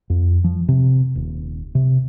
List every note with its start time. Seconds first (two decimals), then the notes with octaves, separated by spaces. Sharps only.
0.10 F2
0.44 F3
0.68 C3
1.15 D#1
1.75 C3